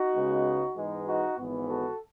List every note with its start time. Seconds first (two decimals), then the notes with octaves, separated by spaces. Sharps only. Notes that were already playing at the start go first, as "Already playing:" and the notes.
Already playing: D#4 F#4
0.14 C#2 C#3 G#3 B3
0.76 G#2 E3 G#3 B3 D#4
1.07 D#4 F#4
1.38 G#1 G#2 E3 B3
1.68 F#4 A4